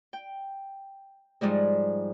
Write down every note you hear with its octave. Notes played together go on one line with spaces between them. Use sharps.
G5
G#2 F3 G3 G#3